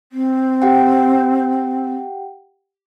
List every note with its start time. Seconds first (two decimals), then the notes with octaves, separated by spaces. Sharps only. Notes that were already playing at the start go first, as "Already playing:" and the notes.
0.12 C4
0.62 G4 F#5 G5